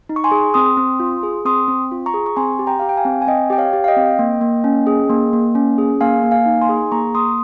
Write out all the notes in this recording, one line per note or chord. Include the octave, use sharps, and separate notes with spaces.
D#4
C#6
G#5 C6
G#4
C4 C6 D#6
C4
F4
G#4
C4 C6 D#6
C4
F4
A#5 C#6
G#4
C#6
C4 G#5 C6
G4
G5 A#5
G4 F5
G5
F5 G#5
C4
G#5
C4 D#5 G5
G4 G5
C#5 F5
G4
F5
D#5 G5
C4
A#3
A#3
C#4
G#4
A#3
A#3
C#4
G#4
A#3 F5 G#5
A#3
F5 G#5
D#4
G#5 C6
G#4
A#3 A#5 C#6
A#3 C6 D#6